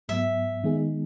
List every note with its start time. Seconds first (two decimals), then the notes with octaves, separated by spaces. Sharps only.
0.09 G#2 F#3 B3 E5
0.64 D#3 G#3 B3 D#4 G#4